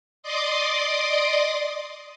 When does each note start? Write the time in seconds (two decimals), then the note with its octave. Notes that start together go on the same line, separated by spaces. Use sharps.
0.23 D5 D#5 C6 D6 D#6